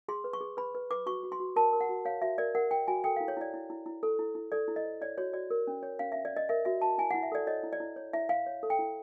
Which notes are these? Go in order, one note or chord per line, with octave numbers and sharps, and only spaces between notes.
G#4 C6
B4
C#6
G#4
B4 B5
B4
B4 D6
F#4 C#6
F#4
C6
F#4
A#4 A5
A#4
F#5
F#4
C#5 F5
F#4 E5
A#4 D5
A#4 F#5
A#4 G5
F#4 G#5
A4 G5
F5
E4
C#5
E4 D5
E4
E4
E4
A4
E4
E4
A4 D5
E4
D#5
C5
C#5 D5
F#4 C#5
F#4 D5
A#4
C#4
C#5
C#4 F5
C#4 E5
D5
C#4 D#5
A#4 E5
F#4 E5
F#4 A5
E4 G#5
F#5
E4
E5
A4 D5
C#5 D#5
E4
D5
E4
C#5
E4 E5
E4 F5
C#5
A4
G5
E4